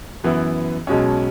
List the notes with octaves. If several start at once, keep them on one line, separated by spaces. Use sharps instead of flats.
F#2 E3 B3 E4
B1 B2 G#3 C#4